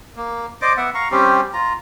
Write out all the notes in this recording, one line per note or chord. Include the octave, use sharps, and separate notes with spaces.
A#3
C5 D5 D#5 D6
B3 E5 F#5
F5 A#5 C#6
G3 C4 C#4 G4
F4 A#5